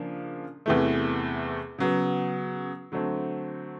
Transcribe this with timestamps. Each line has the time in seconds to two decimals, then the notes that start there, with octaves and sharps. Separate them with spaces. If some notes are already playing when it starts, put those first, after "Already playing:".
Already playing: C#3 F3 A#3 D4 F4
0.66 E2 C3 E3 A3
1.78 C#3 F#3 B3
2.92 D3 F#3 A3 C4